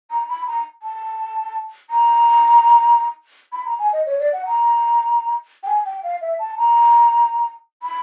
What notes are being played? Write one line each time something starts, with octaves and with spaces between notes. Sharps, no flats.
A#5
B5
A#5
A5
A#5
B5
A#5
G#5
D#5
C#5
D5
F#5
A#5
G5
G#5
G5
F5
E5
A5
A#5
B5